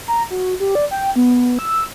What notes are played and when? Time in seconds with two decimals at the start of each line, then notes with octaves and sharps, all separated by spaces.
0.08 A#5
0.30 F#4
0.60 G4
0.75 D5
0.91 G5
1.16 B3
1.59 E6